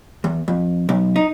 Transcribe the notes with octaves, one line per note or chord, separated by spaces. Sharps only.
E2
F2
B1
D#4